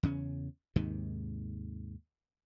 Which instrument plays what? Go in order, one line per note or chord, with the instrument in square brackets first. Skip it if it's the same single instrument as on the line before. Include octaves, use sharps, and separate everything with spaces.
[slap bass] E2 C#3 C#4
D#2 G#2 C3 D#3